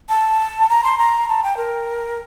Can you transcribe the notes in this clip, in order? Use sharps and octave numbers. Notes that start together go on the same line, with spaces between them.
A5
A#5
C6
A#5
A5
G5
A#4